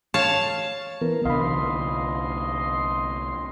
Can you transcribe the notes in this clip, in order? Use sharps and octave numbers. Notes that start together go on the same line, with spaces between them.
C#5 F5 A5
E3 B3 A#4
C2 D3 D#5 F5 B5 C6